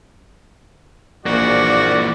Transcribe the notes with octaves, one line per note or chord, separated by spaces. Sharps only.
A#1 E3 A#3 F#4 D5